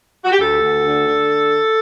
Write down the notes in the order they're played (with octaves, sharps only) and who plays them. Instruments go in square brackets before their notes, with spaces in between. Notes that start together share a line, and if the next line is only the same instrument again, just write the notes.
[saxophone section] F#4
G4
D2 A4
D2
D3
D3